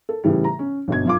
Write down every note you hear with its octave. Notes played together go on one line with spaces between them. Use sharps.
A4
A2 C#3 E3 G3
A#5
C#4
G1 B2 G#6
F#2 F4 D6